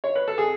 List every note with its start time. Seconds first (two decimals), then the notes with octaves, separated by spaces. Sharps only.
0.04 C#5
0.15 B4
0.28 A4
0.38 G#4